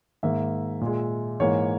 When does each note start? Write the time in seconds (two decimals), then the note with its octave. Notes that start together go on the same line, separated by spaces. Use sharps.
0.23 G#2 D#3 A#3 E5
0.81 A#2 G#3
1.40 G#2 E3 A#3 C#5